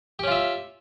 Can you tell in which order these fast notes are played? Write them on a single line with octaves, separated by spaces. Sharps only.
G4 C#4 F4 E5